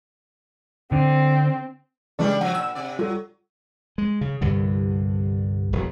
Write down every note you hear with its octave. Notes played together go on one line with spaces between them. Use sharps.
D3 C4
C#3 E3 G3 G#3 D4 A4 D5
F3 F#3 F#5
A#2 E6
C3 D5
F#3 G3 F4 A4
G#3
C#3
C2 G2 D3
E1 F#3